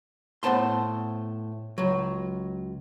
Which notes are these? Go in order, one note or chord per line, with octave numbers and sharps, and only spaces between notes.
A2 B3 C5 A5 C6
C#2 F#3